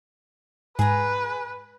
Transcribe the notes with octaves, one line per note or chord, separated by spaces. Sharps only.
G#2 G#4 B4 A#5